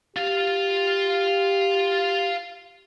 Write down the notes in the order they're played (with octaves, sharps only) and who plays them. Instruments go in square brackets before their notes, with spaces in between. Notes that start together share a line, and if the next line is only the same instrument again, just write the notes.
[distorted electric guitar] F4 F5 [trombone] G4